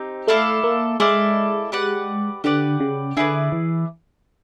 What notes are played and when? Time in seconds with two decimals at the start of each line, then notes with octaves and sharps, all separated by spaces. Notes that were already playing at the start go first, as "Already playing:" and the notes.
Already playing: C4 D#4 G4
0.28 A3 E4 A4 D5 F5
0.64 A#3
1.00 G#3 E4 A4 D5 F5
1.72 G4 B4 D5 F#5
2.44 D3 G4 B4 D5 F#5
2.80 C#3
3.17 D3 E4 G#4 B4 D5
3.52 E3